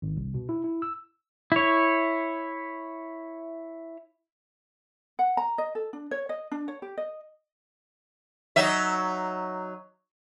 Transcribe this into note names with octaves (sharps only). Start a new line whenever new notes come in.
G#1
C2
B2
E4
E4
E6
E4 C#5
F#5
A#5
D#5
A4
D4
C#5
D#5
D4
C#5
G4
D#5
F#3 D#4 E5